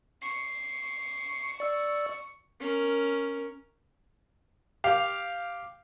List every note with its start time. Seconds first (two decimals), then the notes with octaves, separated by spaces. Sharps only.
0.22 C#6 C7
1.60 D5 E6
2.60 C#4 A#4
4.84 G4 F5